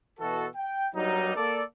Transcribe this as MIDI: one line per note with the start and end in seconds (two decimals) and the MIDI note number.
0.20 0.46 47
0.20 0.46 52
0.20 0.46 66
0.20 0.46 69
0.56 0.88 79
0.95 1.33 43
0.95 1.33 54
0.95 1.33 55
0.95 1.33 58
0.95 1.33 63
1.36 1.62 58
1.36 1.62 69
1.36 1.62 74